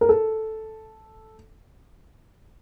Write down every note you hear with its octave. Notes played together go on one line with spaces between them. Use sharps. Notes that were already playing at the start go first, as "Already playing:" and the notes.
A#4
A4